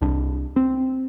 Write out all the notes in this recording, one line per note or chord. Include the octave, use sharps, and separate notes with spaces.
C2 D4
C4